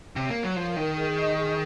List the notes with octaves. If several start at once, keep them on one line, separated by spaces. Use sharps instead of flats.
C3 C#5
A#3
C#5
F#3
F3 A#4
D#3 A#4
G#4
D#5
G#4